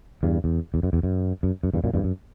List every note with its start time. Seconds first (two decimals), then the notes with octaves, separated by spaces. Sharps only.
0.23 E2 G2
0.44 E2
0.74 E2
0.83 F#2
0.93 E2
1.03 F#2
1.43 F#2
1.63 F#2
1.74 E2 G2
1.84 F#2 A#2
1.94 E2 G2
2.04 F#2